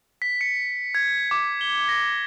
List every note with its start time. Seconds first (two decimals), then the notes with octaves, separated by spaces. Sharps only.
0.22 B6
0.41 C#7
0.95 G#6
1.31 D6
1.61 G7
1.89 A#6